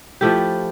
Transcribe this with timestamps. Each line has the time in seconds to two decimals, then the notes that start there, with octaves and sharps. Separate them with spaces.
0.21 F3 A3 E4 G4